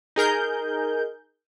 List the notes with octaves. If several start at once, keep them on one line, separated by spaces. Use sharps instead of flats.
D#4 G#4 A#4 G6